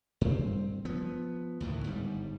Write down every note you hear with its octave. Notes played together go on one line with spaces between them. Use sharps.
G2 C4
F3 B3
D2 A2 D#3 E3
G1 G#2 G3